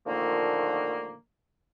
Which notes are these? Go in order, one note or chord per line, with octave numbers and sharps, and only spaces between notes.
A#2 D3 D#3 F3 A3 A#3